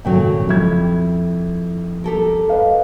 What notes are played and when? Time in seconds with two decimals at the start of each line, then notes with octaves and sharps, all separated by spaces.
0.05 G#1 A#2 C#3 F#3 A4 G5
0.49 F2 E4 G#6
2.04 G4 A4 A#4
2.49 B4 D#5 F5